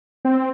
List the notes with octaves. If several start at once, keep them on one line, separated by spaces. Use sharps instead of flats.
C4